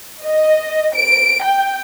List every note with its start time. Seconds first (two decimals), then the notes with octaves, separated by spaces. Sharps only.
0.24 D#5
0.95 D7
1.43 G5